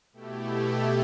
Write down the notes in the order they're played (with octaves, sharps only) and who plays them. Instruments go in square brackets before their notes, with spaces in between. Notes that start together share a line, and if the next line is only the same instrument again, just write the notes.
[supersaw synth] B2 A3 E4 G4